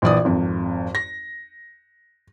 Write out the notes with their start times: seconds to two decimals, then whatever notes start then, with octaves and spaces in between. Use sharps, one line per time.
0.02 A#1 E3 D5 D#6
0.25 G#1 F2
0.95 A#6